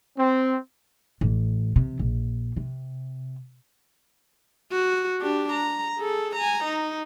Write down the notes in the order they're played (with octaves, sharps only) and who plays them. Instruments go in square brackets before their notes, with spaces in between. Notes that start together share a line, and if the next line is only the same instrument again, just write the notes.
[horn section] C4
[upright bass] A1
C3
A#1
C3
[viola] F#4
D4 G4
A#5
G#4 A4
G#5 A#5
D#4